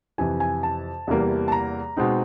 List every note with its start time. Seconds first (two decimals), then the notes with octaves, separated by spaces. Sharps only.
0.18 F2 C3 E3 G#5
0.40 G#5
0.63 A5
1.07 E2 C3 E3 G3 A#3
1.48 A5
1.52 A#5
1.97 B2 G#3 C4 D#4